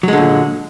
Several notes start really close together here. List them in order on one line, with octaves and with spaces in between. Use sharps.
F#3 G#3 D3 A#2